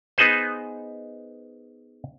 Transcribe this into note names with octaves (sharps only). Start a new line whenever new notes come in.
B3 D#4 G#4 B4 C5